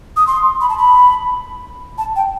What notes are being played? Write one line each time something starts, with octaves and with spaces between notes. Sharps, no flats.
D#6
C6
B5
A5
B5
A5
G5